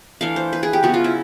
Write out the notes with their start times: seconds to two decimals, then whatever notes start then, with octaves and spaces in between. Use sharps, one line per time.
0.21 E3 A3 D4 F5
0.36 C5
0.53 B4
0.63 G#4
0.73 G4
0.83 C#3 F#3 B3 F#4
0.94 F4
1.04 E4